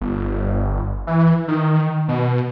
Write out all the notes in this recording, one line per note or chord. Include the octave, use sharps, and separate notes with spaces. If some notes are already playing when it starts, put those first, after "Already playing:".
G1
E3
D#3
B2